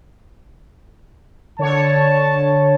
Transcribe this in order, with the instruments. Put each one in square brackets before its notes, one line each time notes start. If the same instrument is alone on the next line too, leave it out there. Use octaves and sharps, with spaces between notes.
[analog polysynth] D3 C#5 [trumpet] A5